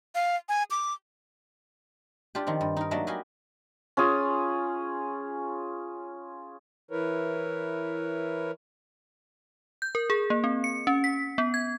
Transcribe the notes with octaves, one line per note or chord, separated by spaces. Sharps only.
F5
G#5
D6
D4 F4 G4
D#3 F3 C4
G2
D#4 A#4
F#3 A3 A#3 D4 D#5 E5
F#4 G4 B4 D#5 F5 G#5
C#4 F4 G#4
E3 E4 A#4 B4 C#5
G6
A#4
G#4
A#3
C4
C#7
C#4
B6
B3
G#6